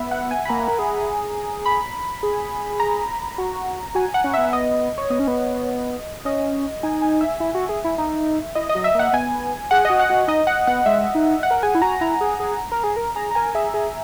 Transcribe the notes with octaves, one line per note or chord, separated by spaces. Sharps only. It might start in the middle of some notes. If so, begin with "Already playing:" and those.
Already playing: B3 E5
F#5
G#5
B5
A#3 A#5
A#4
G#4
B5
G#4
A#5
F#4
F#4 G#5
F#5
C#4
E5
B3
E5
D#5
C#5
B3 D#5
C#4
B3
C#4 D#5
D#4 G#5
G#5
E5
E4
F#4
G#4
E4
D#4
E4 D#5
D#5
F#3
E5
A#3 F#5
B3 G#5
G#4 F#5
F#4 D#5
F#5
F#4 F#5
D#4 D#5
F#5
B3 F#5
G#3 E5
D#4
F#5
A#4
G#4 G#5
E4
F#4 A#5
E4 A#5
G#4
G#4
A#4
G#4
A#4
G#4 A#5
A#5
A#4 G#5
G#4 E5
G#4